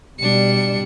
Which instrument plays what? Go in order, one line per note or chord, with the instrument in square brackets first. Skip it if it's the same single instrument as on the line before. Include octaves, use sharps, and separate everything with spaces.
[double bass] B2 G3 [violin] D4 C#7